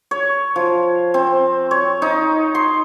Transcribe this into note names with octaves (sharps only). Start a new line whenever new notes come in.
C#5
F3
C4
C#5
D#4
C6